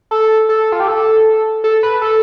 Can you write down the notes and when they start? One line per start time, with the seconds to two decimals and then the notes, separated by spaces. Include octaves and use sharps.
0.11 A4
0.49 A4
0.72 F4
0.80 G4
0.88 A4
1.64 A4
1.83 B4
2.01 A4